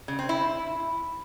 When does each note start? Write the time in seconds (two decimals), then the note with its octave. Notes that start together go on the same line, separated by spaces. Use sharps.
0.08 C#3
0.19 C4
0.29 E4